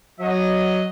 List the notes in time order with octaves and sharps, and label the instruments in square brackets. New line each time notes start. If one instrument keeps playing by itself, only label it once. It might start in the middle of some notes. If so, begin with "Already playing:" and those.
[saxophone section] F#3 [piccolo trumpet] D#5